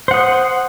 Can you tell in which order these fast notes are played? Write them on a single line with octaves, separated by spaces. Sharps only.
C5 F#5 D#6